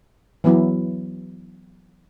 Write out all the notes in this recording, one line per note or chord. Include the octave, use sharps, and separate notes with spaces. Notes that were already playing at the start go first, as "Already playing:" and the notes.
E3 F#3 B3 E4